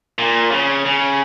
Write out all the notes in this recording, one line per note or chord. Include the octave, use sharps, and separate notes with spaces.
A#2
C#3
C#3